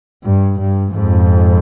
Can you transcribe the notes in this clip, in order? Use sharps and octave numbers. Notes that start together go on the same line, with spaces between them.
G2
G2
F2 G#2